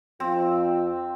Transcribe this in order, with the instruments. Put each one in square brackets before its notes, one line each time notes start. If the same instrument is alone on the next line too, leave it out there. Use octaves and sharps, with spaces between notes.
[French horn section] F2 F4 [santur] C4